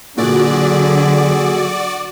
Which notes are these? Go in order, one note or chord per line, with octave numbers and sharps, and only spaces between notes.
A#2 D3 F#3 F#4 G#4 D5 E5